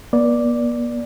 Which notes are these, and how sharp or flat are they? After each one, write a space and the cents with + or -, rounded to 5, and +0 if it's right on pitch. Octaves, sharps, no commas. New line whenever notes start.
B3 -45 D5 +0